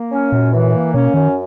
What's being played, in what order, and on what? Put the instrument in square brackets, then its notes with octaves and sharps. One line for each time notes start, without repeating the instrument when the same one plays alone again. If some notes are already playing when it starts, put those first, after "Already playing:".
Already playing: [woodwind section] A#3
C#4
[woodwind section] F#2 [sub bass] A#2
[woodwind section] E3
A#3
[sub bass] B2 [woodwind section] C#4
[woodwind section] F#2 [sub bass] D#3